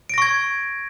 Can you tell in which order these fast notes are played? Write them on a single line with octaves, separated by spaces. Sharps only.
D7 A#6 C#6 G#6